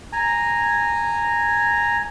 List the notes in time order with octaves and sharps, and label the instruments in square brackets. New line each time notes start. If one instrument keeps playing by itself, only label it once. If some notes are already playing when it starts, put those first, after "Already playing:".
[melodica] G#5 A#5